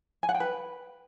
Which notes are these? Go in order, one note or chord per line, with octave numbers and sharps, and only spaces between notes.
G#5
F#5
G5
B4